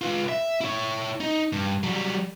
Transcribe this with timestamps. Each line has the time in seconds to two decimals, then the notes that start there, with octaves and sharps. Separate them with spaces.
0.01 F4 B4
0.29 E5
0.61 E4 C#5
1.20 D#4
1.53 G2
1.83 F#3 G3